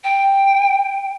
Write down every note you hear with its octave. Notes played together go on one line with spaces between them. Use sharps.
G5